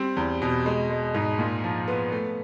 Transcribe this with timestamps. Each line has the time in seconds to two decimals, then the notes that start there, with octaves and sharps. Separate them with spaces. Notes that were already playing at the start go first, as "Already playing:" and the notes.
Already playing: G3 C4
0.17 E2
0.42 B2
0.66 G#3
0.90 G#3
1.15 G#2
1.39 A#2
1.64 F3
1.88 B3
2.12 A3